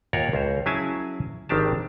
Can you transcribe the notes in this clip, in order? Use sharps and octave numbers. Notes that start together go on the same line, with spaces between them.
D#2 F4 A#4 C#5 F#5
C#2 C5
F#3 C#4 E4 G#4 G#5 A5
G#1 D#3 C4 D4 G4 A5